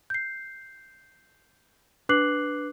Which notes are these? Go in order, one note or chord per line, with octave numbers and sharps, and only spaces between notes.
G6 C7
D4 B4 D6 F#6 C7 F#7